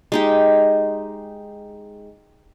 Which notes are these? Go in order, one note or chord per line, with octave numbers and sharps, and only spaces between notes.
G#3 D#4 G4